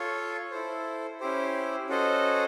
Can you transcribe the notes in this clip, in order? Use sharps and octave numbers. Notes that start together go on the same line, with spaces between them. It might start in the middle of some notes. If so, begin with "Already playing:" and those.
Already playing: F4 A4 C#5
E4 A4 C5
C#4 E4 G4 C5
C#4 F#4 A4 C5 D#5